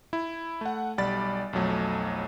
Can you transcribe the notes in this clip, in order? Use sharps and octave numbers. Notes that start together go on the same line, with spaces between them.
E4
A3 F#5
B1 G3 D5 B5 A6
B1 F2 F#3 A3